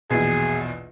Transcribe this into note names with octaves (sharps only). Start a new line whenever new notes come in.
A#1 E2 B2 G#4